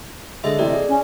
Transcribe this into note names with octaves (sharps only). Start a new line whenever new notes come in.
D3 G#3 D4 A4 D#5 E5
A2 C3 E3 D5
G#4
C#4